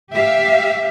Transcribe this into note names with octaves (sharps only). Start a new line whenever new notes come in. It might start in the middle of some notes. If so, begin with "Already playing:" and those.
G4 E5 F5